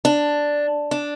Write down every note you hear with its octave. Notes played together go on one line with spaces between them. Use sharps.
D4
D4